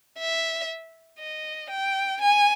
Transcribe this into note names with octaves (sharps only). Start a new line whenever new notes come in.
E5
D#5
G5
G#5